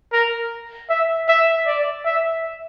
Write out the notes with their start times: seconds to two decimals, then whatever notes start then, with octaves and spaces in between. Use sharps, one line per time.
0.13 A#4
0.89 E5
1.28 E5
1.66 D5
2.05 E5